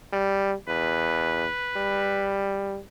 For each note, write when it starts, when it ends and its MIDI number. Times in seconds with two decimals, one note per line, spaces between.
0.13 0.54 55
0.68 1.46 40
0.68 2.37 71
1.77 2.79 55